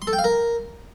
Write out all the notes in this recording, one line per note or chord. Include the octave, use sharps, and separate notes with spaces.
C6
A4
G5
F5
A#4